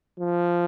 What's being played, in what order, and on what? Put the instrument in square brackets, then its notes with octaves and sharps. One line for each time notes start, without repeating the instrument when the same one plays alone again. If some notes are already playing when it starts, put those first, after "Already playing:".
[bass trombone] F3